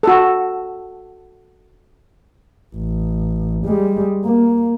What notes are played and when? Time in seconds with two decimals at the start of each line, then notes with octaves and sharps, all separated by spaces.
0.03 F#4 A4
2.74 A1
3.66 G3 G#3
4.25 A#3